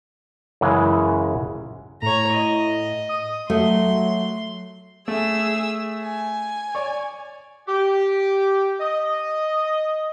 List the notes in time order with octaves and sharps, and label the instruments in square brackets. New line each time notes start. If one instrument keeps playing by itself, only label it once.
[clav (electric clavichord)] F#2 C#3 E3 G#3
[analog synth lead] A2 [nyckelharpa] C#5 A#5
[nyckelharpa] D#5
[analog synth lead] D#6
[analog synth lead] F#3 [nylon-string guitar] A3 [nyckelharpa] C6
[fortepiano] A3 [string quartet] G#4 E6
[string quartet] G#5
[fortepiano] C#5 D5
[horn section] G4
D#5